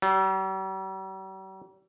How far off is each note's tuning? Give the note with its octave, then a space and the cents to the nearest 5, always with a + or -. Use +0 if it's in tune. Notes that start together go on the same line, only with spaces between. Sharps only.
G3 -45